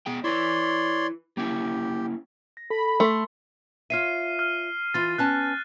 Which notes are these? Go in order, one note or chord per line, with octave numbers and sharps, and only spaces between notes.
B3 G#4 G5
E4 B4 C#5 D5 C6
A#3 C#4 E4 G4
A#6
A4 B5
A3 C6
F4 C#5 E5 F6 C7 D#7
F6
E3 F4 A6
B3 C#4 A5 F#6